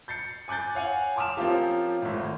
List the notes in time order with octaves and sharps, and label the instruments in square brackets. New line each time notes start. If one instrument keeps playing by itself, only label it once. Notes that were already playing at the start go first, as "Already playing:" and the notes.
[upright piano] G6 A6 C7 C#7
G#5 D6 F#6 G6 A6
C#5 F5 F#5 G#5
A5 C6 D6 D#6 F6 E7
F3 A#3 C4 C#4 F4 G4
G#1 A2